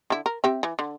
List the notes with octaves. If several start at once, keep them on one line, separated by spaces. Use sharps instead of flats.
D3 E4
A#4
C4 G4 E5
E3
D3